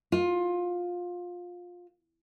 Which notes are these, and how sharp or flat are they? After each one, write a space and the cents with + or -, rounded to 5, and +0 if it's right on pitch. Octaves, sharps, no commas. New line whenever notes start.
F4 +20